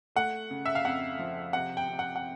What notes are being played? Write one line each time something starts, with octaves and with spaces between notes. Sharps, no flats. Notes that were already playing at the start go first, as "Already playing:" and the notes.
A3 F#5
C#3
E5
F5
F2 F#5
F3
C3 F#5
G5
C3
F#5
F#5